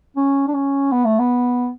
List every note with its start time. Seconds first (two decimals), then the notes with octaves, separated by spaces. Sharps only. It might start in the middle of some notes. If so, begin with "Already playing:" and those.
0.17 C#4
0.48 D4
0.55 C#4
0.92 B3
1.05 A3
1.19 B3